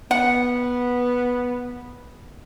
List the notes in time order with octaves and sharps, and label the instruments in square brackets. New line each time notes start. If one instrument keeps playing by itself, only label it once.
[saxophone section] B3 [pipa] F#5